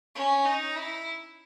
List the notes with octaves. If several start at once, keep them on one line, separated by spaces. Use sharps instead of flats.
C#4
D#4
E4